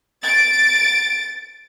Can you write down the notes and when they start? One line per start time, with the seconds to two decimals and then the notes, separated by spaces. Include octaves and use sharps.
0.22 A6 D7